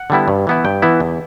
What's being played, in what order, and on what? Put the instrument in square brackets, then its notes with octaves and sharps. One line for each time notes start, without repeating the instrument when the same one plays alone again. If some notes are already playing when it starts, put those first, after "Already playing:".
Already playing: [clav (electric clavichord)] F#5
D3 G3 B3 E4
G2
E3 B3 E4
G2 G5
E3 B3 E4
E2